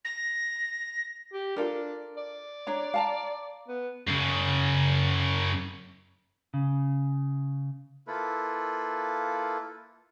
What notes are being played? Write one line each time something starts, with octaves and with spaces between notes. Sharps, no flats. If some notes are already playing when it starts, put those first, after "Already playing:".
A#6
G4
D4 F4 A4 A#4
D5
D4 C#5 A#5
F5 A5 A#5
B3
F#2 C#3
C#3
A#3 E4 F4 A4 B4